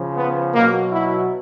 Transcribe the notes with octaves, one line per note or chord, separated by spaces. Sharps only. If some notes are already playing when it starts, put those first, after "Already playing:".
Already playing: C#3 F3
B3
B2 F#3 A#3
E4